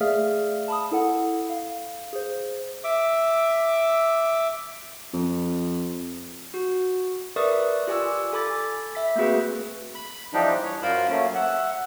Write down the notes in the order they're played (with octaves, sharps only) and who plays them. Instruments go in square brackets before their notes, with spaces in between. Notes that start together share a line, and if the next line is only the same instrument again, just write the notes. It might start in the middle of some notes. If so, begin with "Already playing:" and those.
[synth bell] A3 G#4 D5 E5 F5 F6
A5 B5 D#6
E4 A4 F#5
F5
G#4 C5
[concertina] E5 D6
[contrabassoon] F2
[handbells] F#4
A#4 B4 D5 E5 C#6 D#6
F4 G4 D5 G#5 C#6 E6
A4 G#5 B5 D6 A6
E5 B6
A3 A#3 C4 F#4 G#4 B4
[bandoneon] B5
E3 F3 G3 D4 D#4 G4
C#5
F#2 F4 A#4 C5 B5
F#3 A3 A#3 C#4
E5 F#5